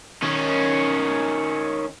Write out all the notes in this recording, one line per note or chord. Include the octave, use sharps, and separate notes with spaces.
D#3 C#4